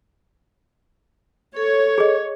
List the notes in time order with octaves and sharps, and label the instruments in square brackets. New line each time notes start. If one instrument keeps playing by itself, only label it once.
[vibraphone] A4 [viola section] C#5
[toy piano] G#4 D#5